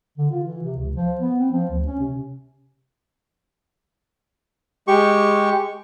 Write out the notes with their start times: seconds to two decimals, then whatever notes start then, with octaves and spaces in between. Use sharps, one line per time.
0.18 D3
0.31 F4
0.44 E3
0.63 C3
0.78 C#2
0.96 F3
1.21 B3
1.40 C4
1.52 F3
1.71 D2
1.86 C#4
2.00 C3
4.88 G#3 G4 C#6